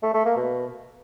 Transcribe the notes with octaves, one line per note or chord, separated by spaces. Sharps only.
A3
A3
A#3
B2